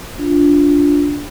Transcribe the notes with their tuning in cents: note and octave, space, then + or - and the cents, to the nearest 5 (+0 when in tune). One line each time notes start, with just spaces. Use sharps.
D4 -15 F4 +5